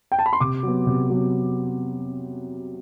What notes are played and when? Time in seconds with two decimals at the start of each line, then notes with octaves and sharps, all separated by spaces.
0.12 G5
0.19 A5
0.26 B5
0.33 C6
0.40 C3 D6
0.63 F#3 B3
0.86 C3
1.10 F#3 B3